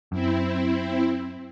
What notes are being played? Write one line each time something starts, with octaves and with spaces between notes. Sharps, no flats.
F#2 C4 E4